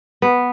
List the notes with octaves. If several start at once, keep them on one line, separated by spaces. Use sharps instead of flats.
B3